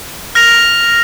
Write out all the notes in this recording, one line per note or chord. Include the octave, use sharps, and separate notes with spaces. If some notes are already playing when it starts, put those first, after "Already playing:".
F6 A#6 F7